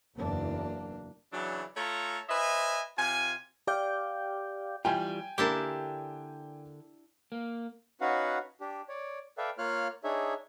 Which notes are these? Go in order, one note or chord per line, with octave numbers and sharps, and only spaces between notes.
F#1 E2 A#3 D4
C#3 E3 F#3 D4
A3 F4 A4 C#5 A#5
B4 C5 D#5 E5 G#5
C3 F4 G#5
G4 D5 F5 G5 D6 G6
E3 G3 F4 G5 G#5
D3 A#3 D4 E4 G4 A#4
A#3
C#4 D#4 F#4 B4 F5 F#5
D4 G4
C#5 D5
A4 B4 D5 E5 F5 G5
A#3 F4 C#5 F5 F6 F#6
D4 D#4 G#4 C#5 E5